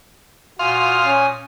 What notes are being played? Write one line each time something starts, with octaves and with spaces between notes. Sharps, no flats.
A#2 F#4 F5 G#5 C6 D#6
C#4